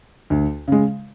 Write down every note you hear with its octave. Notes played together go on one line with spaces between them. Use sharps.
D2
C#3 G#3